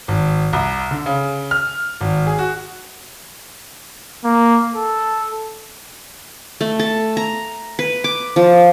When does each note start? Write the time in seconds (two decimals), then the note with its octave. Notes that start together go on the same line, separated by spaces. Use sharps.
0.08 G#1
0.53 C2
0.91 D3
1.06 C#3
1.51 F6
2.01 G#1
2.27 G#4
2.39 F#4
4.24 A#3
4.75 A4
6.61 A3
6.79 A4
7.17 A#5
7.79 B4
8.04 D6
8.36 F3